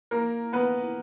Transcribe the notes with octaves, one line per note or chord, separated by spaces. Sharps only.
A#3 A#4
B3 B4